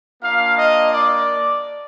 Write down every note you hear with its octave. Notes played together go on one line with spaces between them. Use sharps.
A#3 D4 F4 F5
D#5
D5